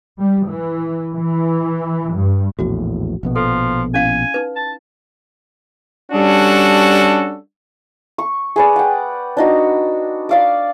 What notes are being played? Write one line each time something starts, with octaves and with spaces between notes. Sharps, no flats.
G3
E3
E3
G2
A#1 E2 A2 F#4
A#1 B2 B3
F3 A4
C#4 E4 F5 G#5
D#4 B4
A5
G3 C#4 D4 F#4 A4
C#6
G#4 B4 D5
F#5 G5
D4 D#4 F#4
D5 F5 D6